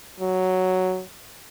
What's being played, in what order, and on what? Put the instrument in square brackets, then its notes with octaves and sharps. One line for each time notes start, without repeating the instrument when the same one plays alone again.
[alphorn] F#3